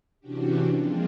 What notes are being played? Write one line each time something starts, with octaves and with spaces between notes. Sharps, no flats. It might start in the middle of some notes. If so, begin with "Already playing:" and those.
C3 E3 C#4 D4 F#4 G4
F3 G#3 A#3 C4 D4 F4